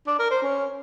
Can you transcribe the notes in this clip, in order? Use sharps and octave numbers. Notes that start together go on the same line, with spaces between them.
D4
A#4
C5
C#4